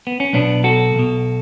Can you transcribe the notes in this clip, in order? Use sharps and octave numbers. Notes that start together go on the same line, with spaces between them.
B3
C#4
B1 B2 B3 D4
F#4 A4
B1 B2